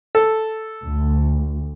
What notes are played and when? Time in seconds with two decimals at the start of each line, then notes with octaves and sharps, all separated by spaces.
0.15 A4
0.84 D2